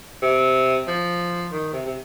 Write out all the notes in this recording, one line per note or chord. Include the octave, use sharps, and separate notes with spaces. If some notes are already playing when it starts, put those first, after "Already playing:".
C3
F3
D#3
C3
C3